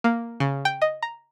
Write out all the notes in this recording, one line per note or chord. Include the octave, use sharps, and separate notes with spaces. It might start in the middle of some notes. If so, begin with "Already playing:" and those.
A#3
C#3
G5
D#5
A#5